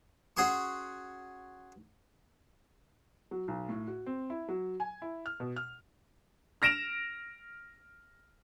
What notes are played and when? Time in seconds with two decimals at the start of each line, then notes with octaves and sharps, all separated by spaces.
0.37 C#4 F#4 G#4 C6 C#6
3.31 F#3
3.48 B1
3.69 A2
3.87 F#4
4.06 C4
4.30 E4
4.49 F#3
4.80 G#5
5.02 E4
5.26 F6
5.40 B2
5.56 F6
6.62 F6 A#6 D7 E7 F7